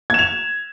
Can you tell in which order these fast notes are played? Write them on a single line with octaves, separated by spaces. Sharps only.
G#6 E7 F7